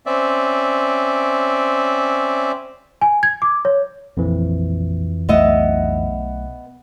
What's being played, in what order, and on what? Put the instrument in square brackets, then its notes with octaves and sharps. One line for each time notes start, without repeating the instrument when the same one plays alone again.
[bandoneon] C4 C#4 D5 E5
[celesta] G#5
G#6
D6
C#5
[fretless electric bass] A#1 [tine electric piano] F2 E3
[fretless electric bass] B1 A3 [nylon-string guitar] B3 D#5 E5